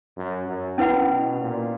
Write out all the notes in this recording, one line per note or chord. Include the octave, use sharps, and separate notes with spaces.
F#2
F#2
C#4 E4 B4 F#5 B5
B2
A#2